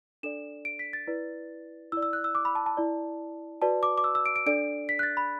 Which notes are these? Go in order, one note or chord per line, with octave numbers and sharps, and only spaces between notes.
D4 A4 D5 E7
D7
B6
A6
E4 B4 D5
E4 D5 E6
E6
F#6
E6
D6
B5
A5
A5
E4 D5
F#4 B4 D5 A5
D6
D6
E6
E6
D7
D7
D4 A4 D5 D7
B6
F#6
A6
B5